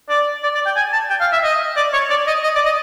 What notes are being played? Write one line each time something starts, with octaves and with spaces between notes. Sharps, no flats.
D5
D5
D5
G5
G#5
A5
G5
F5
E5
D#5
D5
C#5
D5
D#5
D#5
D5
D#5